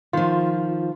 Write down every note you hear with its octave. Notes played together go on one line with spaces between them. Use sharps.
D#3 F3 F4